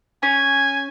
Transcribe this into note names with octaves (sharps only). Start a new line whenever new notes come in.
C#4 G#5